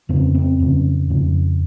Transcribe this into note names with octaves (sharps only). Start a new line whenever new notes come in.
F2 C#3 C4
C4
F2 C#3
F2 C#3